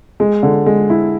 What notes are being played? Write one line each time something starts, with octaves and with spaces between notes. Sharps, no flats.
G#3
D3
G#3
E4